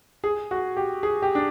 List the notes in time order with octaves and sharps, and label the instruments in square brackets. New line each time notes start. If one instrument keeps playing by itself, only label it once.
[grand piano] G#4
F#4
G4
G#4
G4
D4